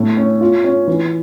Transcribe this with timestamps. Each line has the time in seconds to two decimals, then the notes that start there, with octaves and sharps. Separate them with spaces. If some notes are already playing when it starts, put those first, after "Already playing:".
Already playing: A2 A3
0.17 C#4
0.41 F4
0.64 C#4
0.88 E3